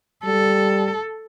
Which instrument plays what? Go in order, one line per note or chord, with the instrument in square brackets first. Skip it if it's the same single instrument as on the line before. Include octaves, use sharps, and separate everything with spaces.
[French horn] G3 [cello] A4